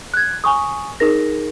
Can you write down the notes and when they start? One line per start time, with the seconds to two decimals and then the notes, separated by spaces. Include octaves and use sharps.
0.14 F#6 G#6
0.44 G#5 C#6 D#6
1.00 D#4 G#4 A#4 A#6